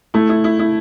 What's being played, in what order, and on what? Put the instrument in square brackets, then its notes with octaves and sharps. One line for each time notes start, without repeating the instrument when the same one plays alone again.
[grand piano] A3 [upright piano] E4
[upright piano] E4
E4
E4